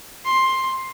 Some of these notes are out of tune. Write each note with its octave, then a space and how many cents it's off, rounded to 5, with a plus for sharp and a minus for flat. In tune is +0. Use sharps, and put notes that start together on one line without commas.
C6 +10